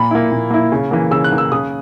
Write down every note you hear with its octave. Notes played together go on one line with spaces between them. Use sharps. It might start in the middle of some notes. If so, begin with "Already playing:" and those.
Already playing: A#2 B5
A#3 E4
A#2
A#3 E4
C#3
E3 A#3
C#3 E6
F#6
E3 A#3
E6
C#3 D#6